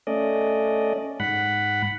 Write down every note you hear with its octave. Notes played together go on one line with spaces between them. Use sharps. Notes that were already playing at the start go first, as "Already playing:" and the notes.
A3 C#4 D5 D#5
G#2 F#5 B5